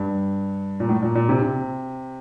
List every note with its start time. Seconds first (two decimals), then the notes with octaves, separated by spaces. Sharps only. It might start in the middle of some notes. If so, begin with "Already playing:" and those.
Already playing: G2
0.80 A#2
0.89 A2
1.02 A#2
1.15 A#2
1.29 C3
1.42 C3